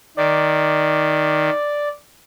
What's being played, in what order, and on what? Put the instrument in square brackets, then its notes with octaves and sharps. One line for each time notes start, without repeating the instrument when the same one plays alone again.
[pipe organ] D#3 [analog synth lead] D5